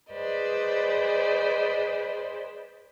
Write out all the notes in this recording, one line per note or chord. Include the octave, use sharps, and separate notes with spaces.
G#4 B4 C5 D5 D#5